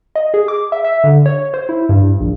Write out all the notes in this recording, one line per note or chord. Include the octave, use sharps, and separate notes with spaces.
D#5
G#4
D6
E5
E5
D3
C#5
C5
E4
G2
A#1